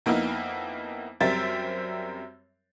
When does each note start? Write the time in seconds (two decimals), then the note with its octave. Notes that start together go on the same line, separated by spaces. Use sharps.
0.06 F2 A#3 B3 D#4 E4 F6
1.20 F#2 G3 C4 A#4 E5 A6